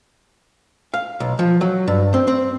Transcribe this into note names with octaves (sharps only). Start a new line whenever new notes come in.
F5
B1
F3
F#3
G2
C4
C4